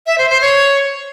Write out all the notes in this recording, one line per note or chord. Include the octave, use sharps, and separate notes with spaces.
E5
C5
C5
C#5